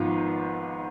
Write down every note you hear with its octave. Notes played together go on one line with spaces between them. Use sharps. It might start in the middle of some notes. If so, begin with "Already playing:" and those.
Already playing: G#1 G#2 F3 B3 F4